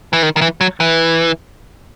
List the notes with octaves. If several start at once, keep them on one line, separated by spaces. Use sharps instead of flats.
E3
D#3
D#3
E3
F#3
E3